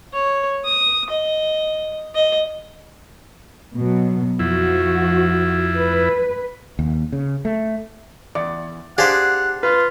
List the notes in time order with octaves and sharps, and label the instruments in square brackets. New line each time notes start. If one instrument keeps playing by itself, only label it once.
[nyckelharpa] C#5
D#6
D#5
D#5
[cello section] B2 F#3
[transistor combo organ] F2 E4 [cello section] F3 F#4
[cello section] B4
[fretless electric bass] D#2
C#3
A3
[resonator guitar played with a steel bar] E2 [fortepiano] D5
[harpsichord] D4 C5 [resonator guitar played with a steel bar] G4 G#4 F5 [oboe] F#5
[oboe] F4 [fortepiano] B4